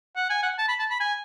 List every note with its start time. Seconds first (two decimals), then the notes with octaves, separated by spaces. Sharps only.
0.16 F#5
0.30 G#5
0.43 F#5
0.58 A5
0.68 B5
0.79 A5
0.90 B5
1.00 G#5